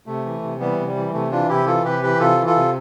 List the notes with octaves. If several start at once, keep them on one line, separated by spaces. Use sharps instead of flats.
C3 A3
E3
C3
E3 G3 B3
C3
G3
E3
C3 A3
E3 D4 F4
C3 E4 G4
E3 F4 A4
C3 G4 B4
E3 G4 B4
C3 F4 A4
E3
F4 A4
C3